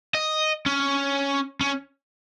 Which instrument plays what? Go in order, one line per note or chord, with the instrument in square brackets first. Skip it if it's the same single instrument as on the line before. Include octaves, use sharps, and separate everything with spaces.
[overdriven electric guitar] D#5
C#4
C#4